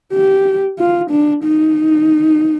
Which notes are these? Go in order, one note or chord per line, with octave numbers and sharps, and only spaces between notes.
G4
F4
D4
D#4